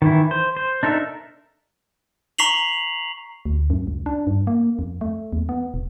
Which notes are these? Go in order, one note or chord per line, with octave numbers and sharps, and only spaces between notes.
D#3 E3 E4
C5
C5
D4 D#4 A4 A#4 E5
A#5 C#6 B6 C7 F7 F#7
D2
F#2
C#2
D4
G2
A#3
F2
A3
E2
B3
E1